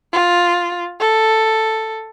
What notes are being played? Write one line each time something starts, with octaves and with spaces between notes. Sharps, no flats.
F4
A4